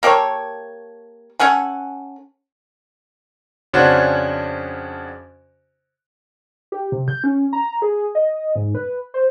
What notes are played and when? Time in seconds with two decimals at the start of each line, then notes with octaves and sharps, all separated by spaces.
0.03 A#3 G4 A4 C#5
1.39 C#4 A4 F#5 G#5
3.74 F2 C#3 C#4 D4 F#4 C5
6.72 G4
6.92 C3
7.08 G6
7.24 C#4
7.53 A#5
7.82 G#4
8.15 D#5
8.56 G#2
8.75 B4
9.14 C5